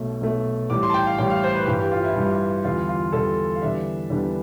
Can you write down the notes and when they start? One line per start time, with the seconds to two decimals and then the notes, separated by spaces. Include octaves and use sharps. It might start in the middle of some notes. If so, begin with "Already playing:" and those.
Already playing: B1 B2 A3
0.21 B1 B2 A3
0.70 A1 A2 G3 D6
0.83 C6
0.90 A5
0.94 G5
1.06 F5
1.18 A1 A2 G3 G5
1.30 F5
1.44 C5
1.55 B4
1.67 G2 E3 G3 G4
1.79 G4
1.92 F4
2.04 E4
2.16 G2 E3 G3
2.64 E2 D3 G3 F4
2.89 F4
3.13 E2 D3 G3 A4
3.55 F5
3.62 E2 D3 G3 B3 D4 E5
4.10 E2 D3 G3 B3 D4